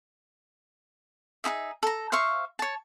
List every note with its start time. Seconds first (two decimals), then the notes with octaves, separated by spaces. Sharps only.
1.44 D#4 E4 G#4 E5
1.83 A4 A#5
2.12 C5 E5 F5 C#6
2.59 C#5 A5